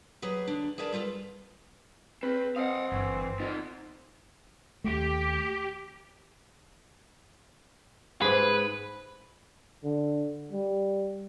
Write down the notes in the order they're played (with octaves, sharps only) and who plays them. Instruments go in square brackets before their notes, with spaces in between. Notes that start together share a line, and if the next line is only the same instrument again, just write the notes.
[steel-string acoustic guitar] F#3 G4 G#4 B4
D3 D4
G#4 A#4 B4 D5 A5
G3 F4 A4 B4
[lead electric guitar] C4 [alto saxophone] B4
[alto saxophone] C4 [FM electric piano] D#5 D#6 [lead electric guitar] F5 F#5
[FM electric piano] G1 G2 C#6 [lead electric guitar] E3
[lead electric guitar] B3 F4 [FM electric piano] D#4
[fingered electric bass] D#2 A3 [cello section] G4
[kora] G#2 G#4 [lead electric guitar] B4
[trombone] D3
G3